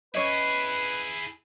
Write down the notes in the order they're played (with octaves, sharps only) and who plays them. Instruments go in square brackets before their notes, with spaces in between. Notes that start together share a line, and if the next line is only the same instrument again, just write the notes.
[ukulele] C#4 C#5 D#5 [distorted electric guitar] E4 G#4 [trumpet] B4